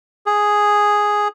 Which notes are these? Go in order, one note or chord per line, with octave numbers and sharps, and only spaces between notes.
G#4